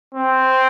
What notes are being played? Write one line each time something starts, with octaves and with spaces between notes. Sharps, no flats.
C4